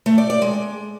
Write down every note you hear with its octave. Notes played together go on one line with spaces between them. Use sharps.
A3
D5
D5
G#3